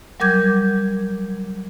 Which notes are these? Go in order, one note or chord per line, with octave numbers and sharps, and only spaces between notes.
F#3 G3 A#4 D6 G6 G#6